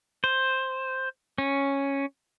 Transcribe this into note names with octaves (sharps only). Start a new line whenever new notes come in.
C5
C#4